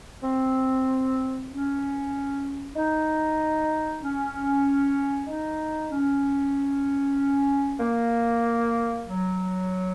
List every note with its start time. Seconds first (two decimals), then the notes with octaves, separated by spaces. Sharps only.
0.23 C4
1.49 C#4
2.76 D#4
4.01 C#4
5.28 D#4
5.91 C#4
7.80 A#3
9.06 F#3